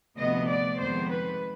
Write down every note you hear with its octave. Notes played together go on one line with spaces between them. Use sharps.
D2 C3 F3 B3 D#5
D5
F2 D#3 G#3 B3 C5
B4